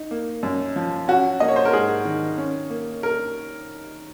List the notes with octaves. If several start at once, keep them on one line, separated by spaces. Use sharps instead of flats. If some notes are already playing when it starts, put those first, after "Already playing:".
Already playing: D#4
A#3
F#2
F3
C#4 F#4
A#3 D#5
C#5
C5
A#4
G#2 G#4
D#3
C#4
A#3
A#4